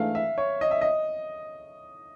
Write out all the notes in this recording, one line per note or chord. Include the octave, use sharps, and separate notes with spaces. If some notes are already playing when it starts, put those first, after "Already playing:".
Already playing: G#2 E3 A3 D4 F5
E5
C#5
D#5
E5
D#5